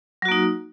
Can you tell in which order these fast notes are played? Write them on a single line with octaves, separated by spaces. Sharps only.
F#3 F#4 A#3 D#4